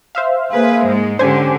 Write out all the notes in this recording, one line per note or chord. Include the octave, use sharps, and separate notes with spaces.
C5 E5 F5
A#3 G#4 B4
G#2 G#3
D3 C#4 G4 C5 G#5